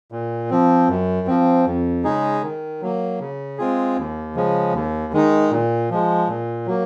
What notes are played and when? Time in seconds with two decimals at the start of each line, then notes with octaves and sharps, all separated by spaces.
0.12 A#2
0.50 F3 C4
0.89 F#2
1.27 F3 C4
1.66 F2
2.04 C#3 G#3 D#4 G#4
2.43 D#3
2.81 F#3 A#3
3.20 C#3
3.58 G#3 C4 F4 G#4
3.97 D#2
4.35 C#3 F3 G#3
4.74 D#2
5.13 D#3 G#3 D#4
5.51 A#2
5.90 F3 G#3
6.28 A#2
6.67 F#3 A#3